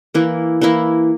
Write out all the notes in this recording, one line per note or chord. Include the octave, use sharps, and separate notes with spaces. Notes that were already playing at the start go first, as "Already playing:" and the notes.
E3 A#3 E4
E3 A#3 E4